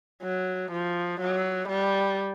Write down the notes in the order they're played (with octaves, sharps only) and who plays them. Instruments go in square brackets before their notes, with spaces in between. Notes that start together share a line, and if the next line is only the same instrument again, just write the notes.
[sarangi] F#3
F3
F#3
G3